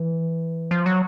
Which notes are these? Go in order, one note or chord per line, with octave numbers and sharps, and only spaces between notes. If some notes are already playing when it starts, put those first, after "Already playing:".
Already playing: E3
F3
F#3